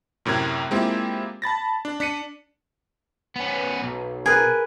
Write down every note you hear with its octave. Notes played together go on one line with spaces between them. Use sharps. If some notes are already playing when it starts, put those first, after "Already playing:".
F#2 A2 C3 A#4 G#6
G#3 A#3 C4 E4 F4 G4
A5 B5 A6 A#6
D4
D4 B6 C#7 D#7
B3 C#4
B1
G#4 A#4 B4